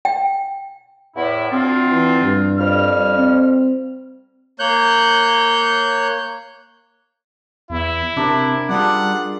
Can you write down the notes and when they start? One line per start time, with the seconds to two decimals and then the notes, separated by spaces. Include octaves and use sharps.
0.05 G5
1.16 E2 A2 E4
1.51 D2 C4 F4
1.89 E3
2.23 G2
2.58 F2 G3 F6
3.16 C4
4.59 A#3 C#5 F#6 G6
7.70 E2 E4
8.17 C3 D4 A#4 D5
8.69 G3 D4 F4 G#4 F#5